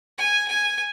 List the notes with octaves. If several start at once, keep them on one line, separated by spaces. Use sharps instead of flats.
G#5
G#5